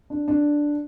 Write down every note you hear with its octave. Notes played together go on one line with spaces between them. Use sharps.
D4
D4